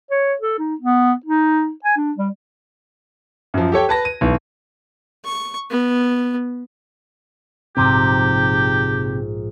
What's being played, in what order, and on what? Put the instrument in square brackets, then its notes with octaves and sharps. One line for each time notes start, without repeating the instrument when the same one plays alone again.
[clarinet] C#5
A4
D#4
B3
D#4
G#5
D4
G3
[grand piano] F#2 F3
G4 A4 C#5 G5
B4 A5 A#6
D#7
B1 E3
[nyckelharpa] C#6
B3
[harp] A#1 G#2 A#5 [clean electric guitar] C3 [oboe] G4